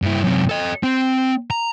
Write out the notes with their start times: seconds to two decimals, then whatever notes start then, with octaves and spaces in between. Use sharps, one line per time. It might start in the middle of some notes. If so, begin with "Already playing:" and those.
0.02 G2 E4
0.24 F#2 C3
0.49 A4 D#5
0.83 C4
1.50 A#5